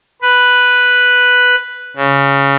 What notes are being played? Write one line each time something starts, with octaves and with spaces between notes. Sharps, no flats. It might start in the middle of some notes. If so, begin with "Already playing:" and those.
B4
C#3